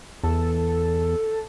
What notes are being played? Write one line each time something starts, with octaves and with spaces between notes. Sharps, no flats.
E2 A4